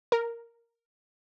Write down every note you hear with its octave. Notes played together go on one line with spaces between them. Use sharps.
A#4